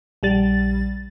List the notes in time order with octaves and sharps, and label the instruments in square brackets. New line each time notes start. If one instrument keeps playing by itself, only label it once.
[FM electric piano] A#1 G3 A6